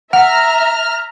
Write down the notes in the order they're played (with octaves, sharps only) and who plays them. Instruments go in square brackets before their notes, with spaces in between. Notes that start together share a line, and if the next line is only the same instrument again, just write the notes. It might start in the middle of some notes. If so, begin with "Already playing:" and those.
[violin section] E5 A#5 [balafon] F#5 [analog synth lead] F6